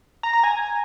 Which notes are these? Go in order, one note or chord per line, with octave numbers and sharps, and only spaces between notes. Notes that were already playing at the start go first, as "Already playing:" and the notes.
A#5
A#5
G#5